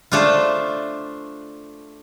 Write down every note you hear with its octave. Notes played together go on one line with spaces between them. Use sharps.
A3 D4 F4 A4 C5